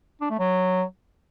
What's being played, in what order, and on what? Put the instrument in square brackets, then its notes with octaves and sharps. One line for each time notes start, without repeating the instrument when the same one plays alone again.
[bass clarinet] D4
A3
F#3